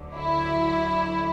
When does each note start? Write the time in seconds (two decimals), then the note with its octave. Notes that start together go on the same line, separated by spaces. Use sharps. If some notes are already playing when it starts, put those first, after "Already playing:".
Already playing: D2 D3 F#3
0.15 E4